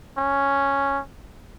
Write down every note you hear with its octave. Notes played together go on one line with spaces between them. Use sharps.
C#4